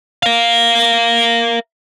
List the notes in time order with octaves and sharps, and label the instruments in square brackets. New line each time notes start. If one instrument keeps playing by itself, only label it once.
[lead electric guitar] A#4 F5